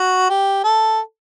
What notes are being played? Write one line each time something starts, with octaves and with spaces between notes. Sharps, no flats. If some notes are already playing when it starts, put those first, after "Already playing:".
Already playing: F#4
G4
A4